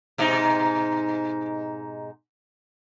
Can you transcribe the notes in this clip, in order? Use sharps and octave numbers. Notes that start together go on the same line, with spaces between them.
G#2 B2 D#4